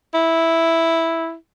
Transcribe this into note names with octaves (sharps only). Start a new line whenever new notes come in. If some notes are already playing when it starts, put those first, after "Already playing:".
E4